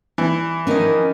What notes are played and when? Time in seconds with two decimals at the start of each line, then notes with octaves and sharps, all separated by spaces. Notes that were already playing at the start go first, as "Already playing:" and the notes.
0.18 E3 G3
0.67 D#3 F3 C#4 A#4 D#5 G#5